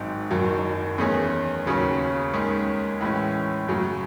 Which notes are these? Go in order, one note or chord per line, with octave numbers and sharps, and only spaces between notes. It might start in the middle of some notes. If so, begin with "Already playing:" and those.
Already playing: G#1 G#2 F#3 C4 D#4
F#1 F#2 D#3 F#3
E2 D#3 A3 C#4 G#4
D#2 C#3 F#3 C#4
D#2 D#3 G#3 C#4 G#4
A2 E3 G#3 C#4
F#2 C#3 F#3 A3